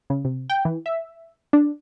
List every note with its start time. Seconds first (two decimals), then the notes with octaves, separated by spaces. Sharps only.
0.10 C#3
0.25 C3
0.50 G5
0.65 E3
0.86 E5
1.53 D4